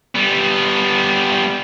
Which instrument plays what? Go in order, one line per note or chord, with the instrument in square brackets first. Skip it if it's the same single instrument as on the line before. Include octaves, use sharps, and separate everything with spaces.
[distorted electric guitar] G3 B3